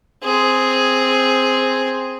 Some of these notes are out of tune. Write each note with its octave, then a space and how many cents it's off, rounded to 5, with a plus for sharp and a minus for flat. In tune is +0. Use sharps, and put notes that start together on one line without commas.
C4 +0 G#4 +0